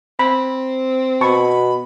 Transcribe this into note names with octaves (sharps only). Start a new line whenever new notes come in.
C4 B5
B2 A5 B5 C#6